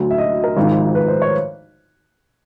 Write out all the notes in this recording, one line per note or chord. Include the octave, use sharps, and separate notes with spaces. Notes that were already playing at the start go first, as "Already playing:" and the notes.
Already playing: D2 D3 F#3
E5
D#5
A#4
G#1 G#2 F3
B4
C5
C#5